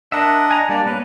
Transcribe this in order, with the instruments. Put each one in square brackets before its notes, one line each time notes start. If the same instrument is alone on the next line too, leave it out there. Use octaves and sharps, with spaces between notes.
[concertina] D4 D#5 F#5 [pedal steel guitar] A#4 E5
[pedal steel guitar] G#5 A#5
[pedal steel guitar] G3 [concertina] A#3 D4 D5
[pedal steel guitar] A#3 B3 C#4 [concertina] B4